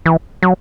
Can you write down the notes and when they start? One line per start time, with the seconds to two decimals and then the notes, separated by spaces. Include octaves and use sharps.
0.06 E3
0.43 F#3